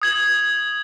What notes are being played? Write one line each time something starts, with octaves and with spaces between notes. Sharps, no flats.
D#6 G#6 F#7